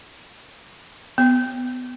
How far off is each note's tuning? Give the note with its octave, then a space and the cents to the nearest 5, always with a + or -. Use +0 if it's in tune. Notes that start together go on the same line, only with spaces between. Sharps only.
B3 +20